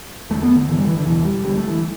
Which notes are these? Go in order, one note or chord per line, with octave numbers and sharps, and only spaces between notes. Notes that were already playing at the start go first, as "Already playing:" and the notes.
E2 D3 A3
B3
D3
G2 D3 E3
G3
E3
D3
E2 B2 E3
G3
D2 D3 G3
A3
E3